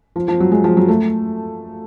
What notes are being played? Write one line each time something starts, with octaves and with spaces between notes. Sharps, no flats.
F3
F3
F#3
G#3
F3
F#3
A3